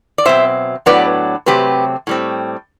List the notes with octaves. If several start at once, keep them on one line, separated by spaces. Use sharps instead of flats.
D5
B2 F#3 C4 C5 E5
A2 F#3 B3 D4 B4 D5
C3 F#3 A3 C4 G4 B4
A2 G3 C4